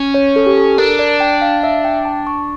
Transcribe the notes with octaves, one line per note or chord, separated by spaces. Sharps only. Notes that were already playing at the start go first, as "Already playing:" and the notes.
Already playing: C#4
C#5
A4
G4
A4
D4 A#4
D5
G5
F5
E5
G5
A5
C#6